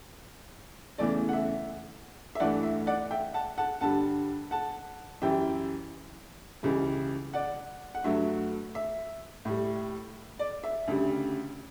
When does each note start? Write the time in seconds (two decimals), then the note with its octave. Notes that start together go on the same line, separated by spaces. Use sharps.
0.98 E2 C#3 E3 A3 D5
1.29 F#5
1.33 E5
2.35 E5
2.40 G2 E3 A3 D5 F#5
2.63 E5
2.87 D5 F#5
3.11 E5 G5
3.34 F#5 A5
3.58 F#5 A5
3.81 G2 D3 G3 F#5 A5
4.51 F#5 A5
5.22 F#2 E3 G3 E5 G5
6.63 C#2 C#3 E3 G3
7.33 D5 F#5
7.95 F#5
8.04 G2 F#3 A3 E5
8.75 E5
9.45 A2 G3
10.39 D5
10.64 E5
10.88 D2 C#3 G3